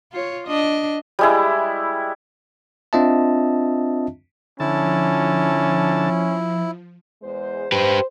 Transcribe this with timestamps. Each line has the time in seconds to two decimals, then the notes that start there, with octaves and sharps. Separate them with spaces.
0.12 F4 C#5
0.48 D4 D#5
1.19 G3 G#3 E4
2.93 C4 D4 F4 D#5 E5 A5
4.60 D3 F3 C#4 E4 A5
7.22 E2 G#3 C5
7.72 G4 B4 C5